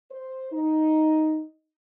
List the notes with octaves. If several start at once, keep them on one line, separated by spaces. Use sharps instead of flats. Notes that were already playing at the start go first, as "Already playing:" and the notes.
C5
D#4